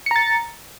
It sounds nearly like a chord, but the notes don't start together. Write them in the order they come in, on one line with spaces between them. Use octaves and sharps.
C#7 A#5 A6